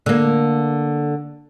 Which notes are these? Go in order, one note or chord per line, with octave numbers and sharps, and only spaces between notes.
D3 A#3